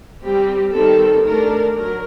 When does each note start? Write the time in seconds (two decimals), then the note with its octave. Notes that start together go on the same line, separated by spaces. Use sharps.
0.23 G3 C4 G4
0.73 D#3 G3 C4 A4
1.24 D#3 A3 D4 A#4
1.76 F#3 A#4